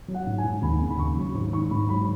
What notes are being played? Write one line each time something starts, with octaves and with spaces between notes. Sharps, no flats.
F#3
F#5
G#2
G#5
G#2
D#2 B5
C#3
B5
D#2 C#6
F#3
G#2 C#6
D#3 C#6
G#2 B5
F#3 B5